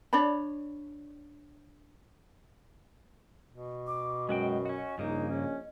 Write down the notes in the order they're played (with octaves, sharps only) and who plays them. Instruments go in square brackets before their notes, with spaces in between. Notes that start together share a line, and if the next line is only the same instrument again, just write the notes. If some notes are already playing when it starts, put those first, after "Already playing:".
[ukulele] D4 C#5 D5 B5
[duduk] B2
[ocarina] D6
[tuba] F#2 [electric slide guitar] G#3 F#4 G5 [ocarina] D#5
[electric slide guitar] C#4 F#4
[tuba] A#1 [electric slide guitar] G2 C#3 A#3 [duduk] D#4
[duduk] C#4